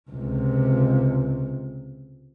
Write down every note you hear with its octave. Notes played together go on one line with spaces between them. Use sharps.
C#2 C3